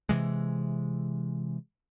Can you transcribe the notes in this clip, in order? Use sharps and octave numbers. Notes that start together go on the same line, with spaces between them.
C3 E3 G#3